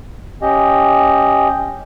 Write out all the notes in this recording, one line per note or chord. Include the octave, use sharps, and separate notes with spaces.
C#4 G4 D#5